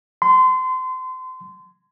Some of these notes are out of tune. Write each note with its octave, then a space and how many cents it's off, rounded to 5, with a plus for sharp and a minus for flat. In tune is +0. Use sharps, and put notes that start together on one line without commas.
C6 -30